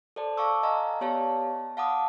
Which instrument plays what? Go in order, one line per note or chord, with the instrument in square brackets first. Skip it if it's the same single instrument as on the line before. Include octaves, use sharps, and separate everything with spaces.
[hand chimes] A4 C5 D5 A5
F5 A5 C#6 D6 E6
D#5 F5 G#5 A#5
B3 G4 C#5 D5 F5 A5
F5 F#5 A5 B5 D6 D#6